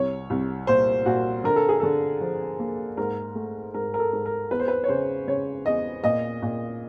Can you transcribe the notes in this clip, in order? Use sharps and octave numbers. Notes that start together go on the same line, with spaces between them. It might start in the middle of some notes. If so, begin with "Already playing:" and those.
Already playing: C2 C#5
C2
A#2 C5
A#2 F#4
D3 A#4
A4
G#4
D3 A4
F3
A#3
G#2 A#4
A3
G#2 A#4
A#4
A4
G#2
A#4
E2 B4
C5
B4
C#5
C#3 C5
C#3 C#5
E2 D#5
A#2 D#5
A#2